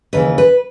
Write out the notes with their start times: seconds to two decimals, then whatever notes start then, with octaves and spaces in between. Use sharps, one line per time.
0.13 D#2 C#3 E3 B4
0.38 B4